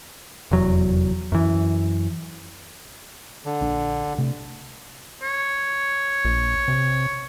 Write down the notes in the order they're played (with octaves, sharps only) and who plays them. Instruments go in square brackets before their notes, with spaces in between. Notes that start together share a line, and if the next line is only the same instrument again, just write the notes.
[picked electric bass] F1 E2 F#3
F#2 E3
[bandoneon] D3
[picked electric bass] A#1 D4
C3 A3
[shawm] C#5
[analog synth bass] A#1
C3